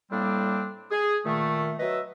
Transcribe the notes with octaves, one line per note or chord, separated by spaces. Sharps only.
A2 G3 A#3 C4 D4
G#4
A#2 D#3 A3
F#3 B4 D#5 E5